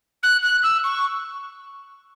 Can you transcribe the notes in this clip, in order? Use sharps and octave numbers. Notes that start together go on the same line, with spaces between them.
F#6
F#6
E6
C#6